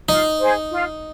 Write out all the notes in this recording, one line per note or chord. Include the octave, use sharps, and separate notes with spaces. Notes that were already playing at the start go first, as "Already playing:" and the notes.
D#4 F4
G#4 C5
F4